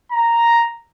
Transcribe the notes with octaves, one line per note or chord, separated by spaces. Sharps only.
A#5